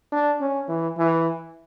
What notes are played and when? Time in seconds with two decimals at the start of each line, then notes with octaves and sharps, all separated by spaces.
0.12 D4
0.41 C#4
0.68 E3
0.98 E3